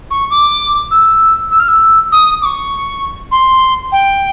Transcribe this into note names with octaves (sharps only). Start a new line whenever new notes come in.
C#6
D6
E6
E6
F6
E6
D#6
D6
C#6
C6
G5